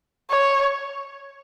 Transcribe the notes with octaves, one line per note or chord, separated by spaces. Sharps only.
C#5